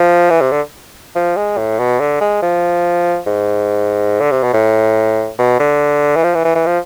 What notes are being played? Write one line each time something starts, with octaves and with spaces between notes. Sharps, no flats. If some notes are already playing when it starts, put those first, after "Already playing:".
Already playing: F3
E3
C3
D3
F3
G#3
A2
B2
D3
G#3
F3
G#2
D3
C3
B2
A2
B2
D3
E3
F3
E3
E3
E3
F3